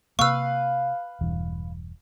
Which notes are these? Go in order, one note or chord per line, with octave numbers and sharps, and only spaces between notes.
C3 A#3 B4 F5 C#6 E6
E1 G2 E3